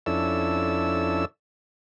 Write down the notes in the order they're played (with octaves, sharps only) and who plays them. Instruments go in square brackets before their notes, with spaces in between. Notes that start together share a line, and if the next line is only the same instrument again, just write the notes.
[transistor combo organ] F2 C#4 D4 E4 A4 E6